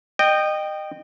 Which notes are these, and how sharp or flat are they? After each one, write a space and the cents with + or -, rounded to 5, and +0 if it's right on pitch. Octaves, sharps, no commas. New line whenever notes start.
D#5 -25 G5 +0